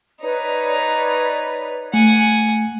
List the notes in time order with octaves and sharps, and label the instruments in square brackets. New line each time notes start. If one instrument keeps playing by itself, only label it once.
[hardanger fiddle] D#4 [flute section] B4 C#5 D5
[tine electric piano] A3 [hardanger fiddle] F#5 G#5